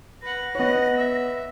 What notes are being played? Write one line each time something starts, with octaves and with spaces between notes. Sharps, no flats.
B4 F#5 A#6
B3 C#5 D#5 F#5
E5